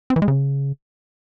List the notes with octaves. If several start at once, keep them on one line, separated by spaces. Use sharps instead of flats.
C4
E3
G#3
C#3